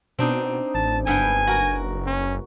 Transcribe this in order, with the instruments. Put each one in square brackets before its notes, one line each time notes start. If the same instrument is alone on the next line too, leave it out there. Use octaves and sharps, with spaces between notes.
[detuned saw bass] B2 [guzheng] C4 D4 D#4
[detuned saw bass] A1 [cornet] A5
[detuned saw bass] F#1 [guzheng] G2 B3 G5 [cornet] G#5
[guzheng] F#4 A#4
[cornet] C#4